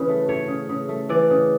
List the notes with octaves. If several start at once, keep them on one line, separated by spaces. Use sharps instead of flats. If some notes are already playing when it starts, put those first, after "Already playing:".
Already playing: C#3 E3 B4
A3
A3 C#5
C#3
C#3
A3
E3 D5
C#3